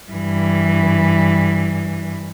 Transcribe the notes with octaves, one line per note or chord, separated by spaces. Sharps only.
G2 E3